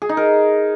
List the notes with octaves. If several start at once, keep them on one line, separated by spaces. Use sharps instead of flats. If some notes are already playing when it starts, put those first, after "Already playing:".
G#4
D#4
A#4